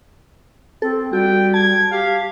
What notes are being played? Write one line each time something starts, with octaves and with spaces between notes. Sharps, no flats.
C4 A4
G3 F#4 G5
A5 G#6
G4 F5